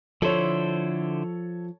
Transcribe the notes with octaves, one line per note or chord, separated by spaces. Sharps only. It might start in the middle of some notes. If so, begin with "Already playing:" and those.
D3 F3 E4 A4 C5 C#5